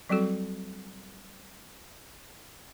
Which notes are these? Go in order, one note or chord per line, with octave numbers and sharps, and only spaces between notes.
F#3 G3 C4 F#4 A4